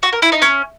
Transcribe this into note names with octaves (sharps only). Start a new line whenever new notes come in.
F#4
A#4
E4
D#4
C#4